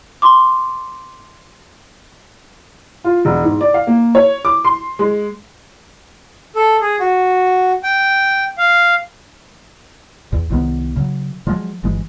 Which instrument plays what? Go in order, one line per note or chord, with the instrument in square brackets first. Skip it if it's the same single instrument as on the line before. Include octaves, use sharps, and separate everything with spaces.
[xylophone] C6 D6
[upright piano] F4
E1
G#2
D5
F5
A#3
C#5
D6
C6
G#3
[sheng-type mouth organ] A4
G#4
F#4
G5
F5
[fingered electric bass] E2
C2 D#3 B3
C#3 F#3
F3 F#3 G#3
G1 E3 G#3